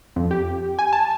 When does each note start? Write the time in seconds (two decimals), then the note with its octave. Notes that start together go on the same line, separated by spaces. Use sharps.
0.16 F2
0.31 G4
0.79 G#5
0.93 A5